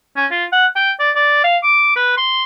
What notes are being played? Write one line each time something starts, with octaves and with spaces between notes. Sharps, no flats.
C#4
F4
F#5
G5
D5
D5
F5
D6
B4
C6